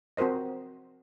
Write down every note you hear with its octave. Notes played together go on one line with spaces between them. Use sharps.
C4 F#4 A#4 C5 D#5